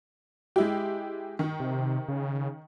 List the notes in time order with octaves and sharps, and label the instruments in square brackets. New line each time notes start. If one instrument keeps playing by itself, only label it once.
[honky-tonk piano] G#3 E4 G4
D#3
[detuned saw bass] C3
C#3